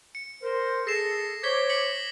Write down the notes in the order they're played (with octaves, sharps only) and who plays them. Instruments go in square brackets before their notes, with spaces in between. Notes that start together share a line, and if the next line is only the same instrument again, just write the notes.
[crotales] C#7
[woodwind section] A#4 C5
[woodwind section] G#4 A4 [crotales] A#6 C7 E7
[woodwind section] C5 C#5 D6 [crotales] G#6 B6 G7
[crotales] B6 C#7 F#7